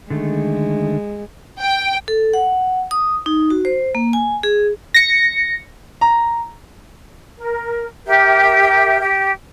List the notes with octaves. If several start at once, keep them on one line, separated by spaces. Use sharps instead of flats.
D3 D#3 G#3 A3
G5
A4
F#5
D#6
D#4
F#4
C5
A#3
G#5
G#4
A#6 C#7
A#5
A#4
G4 A#4 E5 G6
G4